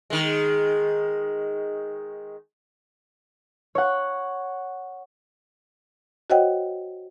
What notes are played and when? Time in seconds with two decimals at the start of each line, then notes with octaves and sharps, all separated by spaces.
0.10 D#3 G#3
3.75 C#5 F#5
6.30 F#4 C5 C#5 D#5 F#5 G5